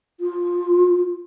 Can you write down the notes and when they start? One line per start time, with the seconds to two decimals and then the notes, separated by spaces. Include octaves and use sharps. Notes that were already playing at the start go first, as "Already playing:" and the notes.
0.20 F4